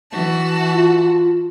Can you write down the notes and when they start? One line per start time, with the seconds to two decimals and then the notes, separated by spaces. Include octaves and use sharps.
0.11 E3 F#4 A5
0.73 F4